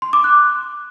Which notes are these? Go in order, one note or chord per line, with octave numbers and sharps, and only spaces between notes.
C6
D6
F#6